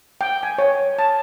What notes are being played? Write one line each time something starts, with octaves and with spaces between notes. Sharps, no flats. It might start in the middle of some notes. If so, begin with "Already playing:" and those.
G5
G#5
C#5
A5